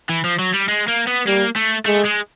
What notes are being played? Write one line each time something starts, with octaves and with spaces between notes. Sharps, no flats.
E3
F3
F#3
G3
G#3
A#3
B3
G3 A#3
A3
G#3 A3
G#3